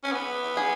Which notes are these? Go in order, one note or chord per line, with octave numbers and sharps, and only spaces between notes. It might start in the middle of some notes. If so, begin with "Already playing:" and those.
C#4
B3
G#4